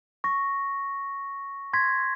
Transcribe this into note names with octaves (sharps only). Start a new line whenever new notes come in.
C#6 A#6
C6 G#6 A#6 B6